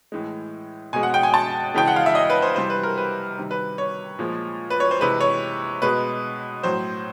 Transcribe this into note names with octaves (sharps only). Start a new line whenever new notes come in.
A2 E3 G#3
B2 G#3 G#5
F#5
G5
G#5
A5
C#3 E3 G#3 G5
F#5
F5
E5
D#5
B4
C5
C3 E3 G3 C5
B4
A#4
B4
C3 D#3 G3
B4
C#5
A#2 F3 G#3
B4
C#5
C5
C3 E3 G#3 B4
C#5
B2 G#3 B4
A2 F#3 C5